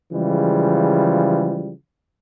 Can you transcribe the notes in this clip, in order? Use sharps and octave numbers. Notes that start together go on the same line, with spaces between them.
C#3 E3 F3 G3 G#3